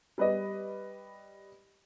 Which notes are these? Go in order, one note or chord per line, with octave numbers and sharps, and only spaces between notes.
G3 B4 D5 D#5